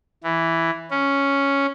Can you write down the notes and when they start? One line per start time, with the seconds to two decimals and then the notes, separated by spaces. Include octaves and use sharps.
0.23 E3
0.91 C#4